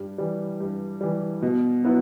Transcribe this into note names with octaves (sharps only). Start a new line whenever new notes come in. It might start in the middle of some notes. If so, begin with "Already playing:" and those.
Already playing: G2
E3 G3
G2
E3 G3
B2
F#3 B3 E4 B4